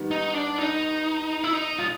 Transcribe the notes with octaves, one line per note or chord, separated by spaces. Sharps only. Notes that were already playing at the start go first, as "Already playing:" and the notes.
Already playing: D#3 G3 B3
D#4
D4
D#4
E4
D#4
F4